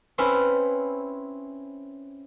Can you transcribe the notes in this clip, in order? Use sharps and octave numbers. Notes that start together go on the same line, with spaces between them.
C4 C#4 E4 B4